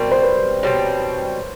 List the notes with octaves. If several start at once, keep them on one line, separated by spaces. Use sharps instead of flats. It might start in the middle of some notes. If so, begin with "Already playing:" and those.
Already playing: B2 G3 C4 A#4
C5
B4
B2 G3 C4 C#5